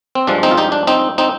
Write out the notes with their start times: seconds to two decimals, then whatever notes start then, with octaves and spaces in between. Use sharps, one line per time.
0.15 C4
0.27 G2 F3 G#3 D4
0.43 C4 D#4
0.51 F4
0.58 D#4 G4
0.72 D4
0.87 C4 D#4
1.18 C4 D#4